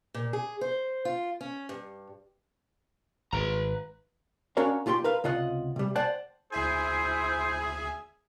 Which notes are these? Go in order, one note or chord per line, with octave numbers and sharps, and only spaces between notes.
A#2
G#4
C5
F4
C#4
G2
G#1 B4 A#5
C#4 D4 F#4 A#4 C#5 F5
B1 F4 G4 G5 C6
A#4 B4 F5
C#2 C3 F4 D#5 F#5
C3 G3
C5 D5 F#5 G5 A5
D2 E4 G#4 C5 E5 G#5